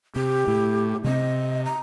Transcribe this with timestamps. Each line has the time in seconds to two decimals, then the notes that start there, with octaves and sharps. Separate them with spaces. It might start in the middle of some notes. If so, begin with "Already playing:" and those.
0.16 C3 G4
0.48 A2
1.04 C3 A3 C4 D#5
1.65 A#5